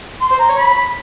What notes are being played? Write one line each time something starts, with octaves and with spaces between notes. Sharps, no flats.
C6
C5
A#5
C#5
B5